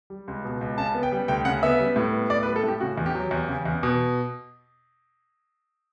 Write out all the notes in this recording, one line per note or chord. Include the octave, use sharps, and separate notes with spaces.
G3
C#2
B2
C#2
C#3 A5
B3
G5
G3
D2 G5
C#3 F#5
B3 E5
G3
A2
B3
A2 D5
B4
G3
A4
A2 G4
C#3 F#4
E2
G4
F#3
E2
C#3
E2
B2